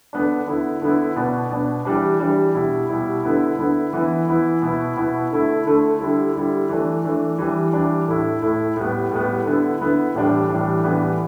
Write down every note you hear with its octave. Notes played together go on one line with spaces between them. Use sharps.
D3 B3 D4
D3 B3 E4
D3 B3 E4
B2 B3 D4
B2 B3 D4
E3 G3 D4
E3 G3 D4
B2 G3 E4
B2 G3 E4
D3 B3 E4
D3 B3 E4
E3 B3 E4
E3 B3 E4
B2 B3 E4
B2 B3 E4
D3 A3 E4
D3 A3 E4
D3 G3 E4
D3 G3 E4
E3 A3 D4
E3 A3 D4
E3 G3 D4
E3 G3 D4
A2 A3 E4
A2 A3 E4
A2 G3 B3
A2 G3 B3
D3 B3 E4
D3 B3 E4
A2 E3 G3 D4
A2 E3 G3 D4
A2 E3 G3 B3 D4